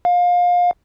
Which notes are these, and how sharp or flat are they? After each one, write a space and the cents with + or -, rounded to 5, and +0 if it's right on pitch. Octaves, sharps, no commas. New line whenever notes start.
F5 +25